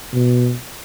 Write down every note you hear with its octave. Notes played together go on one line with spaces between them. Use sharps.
B2